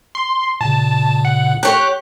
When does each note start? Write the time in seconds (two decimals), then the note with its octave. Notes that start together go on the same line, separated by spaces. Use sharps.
0.15 C6
0.61 A#2 C#3 A5
1.25 F#5
1.63 G4 C#5 F#6